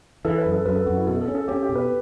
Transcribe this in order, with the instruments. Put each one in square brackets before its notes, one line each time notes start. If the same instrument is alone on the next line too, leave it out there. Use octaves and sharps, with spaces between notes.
[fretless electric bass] E3 [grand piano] A4
[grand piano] B4
[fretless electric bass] F#2
[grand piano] A4
[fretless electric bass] F#2 [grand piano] B4
[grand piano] A4
[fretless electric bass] F#2 [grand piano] F#4
[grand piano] E4
[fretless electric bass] B2 [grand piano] A4
[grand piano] A4
[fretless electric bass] C#4
[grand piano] A4
[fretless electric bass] C#4 [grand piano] G4
[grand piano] G4
[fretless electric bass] B2
[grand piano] B4